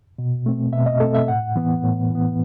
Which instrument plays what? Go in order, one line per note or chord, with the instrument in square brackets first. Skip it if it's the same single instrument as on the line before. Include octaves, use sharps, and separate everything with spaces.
[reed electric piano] B2
A3 C4
B2 E5
D#5
A3 C4 A4
E5
A2 F#5
E3 B3
A2
E3
B3